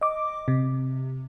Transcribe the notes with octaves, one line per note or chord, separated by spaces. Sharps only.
D#5 D6
C3